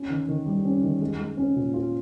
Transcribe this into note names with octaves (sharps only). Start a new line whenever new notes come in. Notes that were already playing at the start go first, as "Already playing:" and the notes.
Already playing: C#4
D#3
D#3
G3
C#4
D#3
G#3
G#3
C#4
A#2
F4